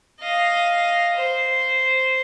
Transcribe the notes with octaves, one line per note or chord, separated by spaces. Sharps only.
D#5 F5
C5